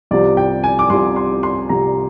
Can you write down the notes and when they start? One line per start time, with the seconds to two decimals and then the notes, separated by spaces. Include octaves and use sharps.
0.11 C2 C3 F3 D5
0.37 G5
0.64 G#5
0.79 D6
0.90 C2 C3 F3 C6
1.16 C6
1.43 C6
1.69 C2 C3 F3 A#5